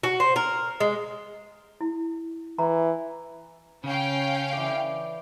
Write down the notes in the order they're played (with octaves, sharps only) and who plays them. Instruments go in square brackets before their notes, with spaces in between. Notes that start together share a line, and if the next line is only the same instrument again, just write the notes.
[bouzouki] F#4
C5
A#4
G#3
[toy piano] E4
[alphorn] E3 [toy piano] A#5
[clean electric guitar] C#3 [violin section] C#4 F5 G5
[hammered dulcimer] E3 D5